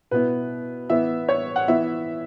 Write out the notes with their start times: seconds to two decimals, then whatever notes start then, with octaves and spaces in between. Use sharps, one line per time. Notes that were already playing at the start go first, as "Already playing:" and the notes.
0.11 B2 B3 E4 B4
0.90 E3 B3 E4 E5
1.29 C#5
1.56 F#5
1.68 E3 B3 E4 E5